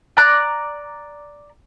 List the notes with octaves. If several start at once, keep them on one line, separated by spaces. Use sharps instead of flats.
D5 A#5 F#6